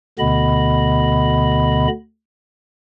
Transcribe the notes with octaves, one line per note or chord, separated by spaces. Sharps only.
D2 B2 D3 B3 D#5 B5